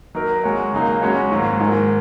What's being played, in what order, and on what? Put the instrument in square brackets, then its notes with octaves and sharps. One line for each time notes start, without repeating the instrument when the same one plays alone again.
[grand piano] F#3 D#4 A#4
G#3 F#4 C#5
C#3 F#3 A#3 D#4 G#4
G#3 C#4 F#4 C#5
G#2 D#3 F#3 A#3
G#2 D#3 G#3